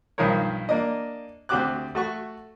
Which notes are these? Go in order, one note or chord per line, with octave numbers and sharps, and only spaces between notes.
B1 G2 D#3 F3 A#4 C#5
A#3 D4 D#5
D2 C4 F#4 G4 D6 F#6
A3 F#4 C#6